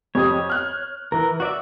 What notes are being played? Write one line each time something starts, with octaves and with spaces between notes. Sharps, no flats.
F2 G4 C#5 D#6
F6 F#6
E3 A#4
F#4 D5 E5